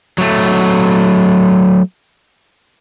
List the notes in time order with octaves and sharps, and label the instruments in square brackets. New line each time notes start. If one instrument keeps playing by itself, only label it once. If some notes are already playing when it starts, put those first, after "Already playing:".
[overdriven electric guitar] F#3 A3